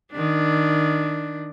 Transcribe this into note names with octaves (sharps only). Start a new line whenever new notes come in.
D#3 D4